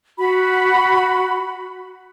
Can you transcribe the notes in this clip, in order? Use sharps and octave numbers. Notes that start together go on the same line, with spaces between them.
F#4 B5